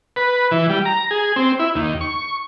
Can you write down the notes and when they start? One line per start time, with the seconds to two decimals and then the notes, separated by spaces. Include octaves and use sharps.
0.16 B4
0.51 E3
0.70 G3
0.85 A#5
1.11 G#4
1.36 C4
1.59 E4
1.76 D#2
2.01 C#6